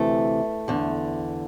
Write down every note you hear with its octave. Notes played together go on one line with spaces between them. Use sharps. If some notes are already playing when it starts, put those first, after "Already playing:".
Already playing: D2 C3 E3 A3
E2 D3